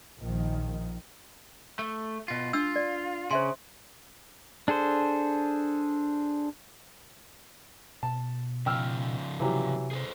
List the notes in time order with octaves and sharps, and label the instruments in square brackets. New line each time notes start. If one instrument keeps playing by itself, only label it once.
[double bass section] A#1 D#3 F3
[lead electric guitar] A3
B2 F4
[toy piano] D4 E6 [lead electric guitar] F4
[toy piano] D5
[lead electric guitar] C#3 [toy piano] C5 E5 C6
[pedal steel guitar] D4 G#4 A4 C5
[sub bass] B2 [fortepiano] A5
[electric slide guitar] C#3 F3 [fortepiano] G5 E6 F6
[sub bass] C3 [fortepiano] E3 F#3 G4
[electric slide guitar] G#4 A4 C5